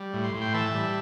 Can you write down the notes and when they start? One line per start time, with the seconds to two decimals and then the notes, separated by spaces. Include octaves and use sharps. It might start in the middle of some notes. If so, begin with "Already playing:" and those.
Already playing: G3
0.14 A2
0.24 C6
0.34 A2
0.41 G5 C6
0.54 E3 E5 A5
0.74 G3